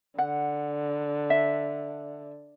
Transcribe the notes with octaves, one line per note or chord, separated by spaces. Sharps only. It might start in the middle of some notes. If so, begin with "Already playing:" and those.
D3 F#5
E5